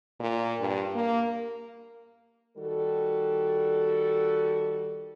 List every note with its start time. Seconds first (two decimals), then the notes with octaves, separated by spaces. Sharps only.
0.20 A#2
0.60 G2
0.95 A#3
2.57 D#3 G3 F#4 A4